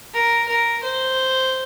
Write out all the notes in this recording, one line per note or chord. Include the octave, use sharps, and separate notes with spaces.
A#4
A#4
C5